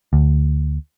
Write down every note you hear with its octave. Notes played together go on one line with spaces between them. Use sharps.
D2